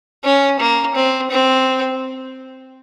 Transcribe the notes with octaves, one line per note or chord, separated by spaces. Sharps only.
C#4
A#3
C4
C4